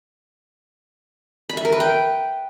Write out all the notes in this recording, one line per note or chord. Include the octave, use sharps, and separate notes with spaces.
B5
E5
A#4
B4
G5